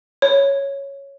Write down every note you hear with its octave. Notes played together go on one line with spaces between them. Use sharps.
C#5